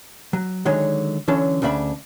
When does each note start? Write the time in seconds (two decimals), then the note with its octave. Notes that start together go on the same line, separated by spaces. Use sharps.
0.33 F#3
0.65 D3 D#3 F#3 G#3 C#5
1.28 D3 E3 F#3 C#4 A4
1.62 D2 C#3 D4 E5 B5